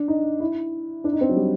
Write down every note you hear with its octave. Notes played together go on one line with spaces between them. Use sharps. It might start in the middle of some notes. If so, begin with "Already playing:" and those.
Already playing: D4
D#4
E4
D4
D#4
C4
F#3
G3